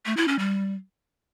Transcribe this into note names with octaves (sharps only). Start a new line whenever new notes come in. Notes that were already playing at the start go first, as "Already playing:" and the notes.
A3
E4
C#4
G3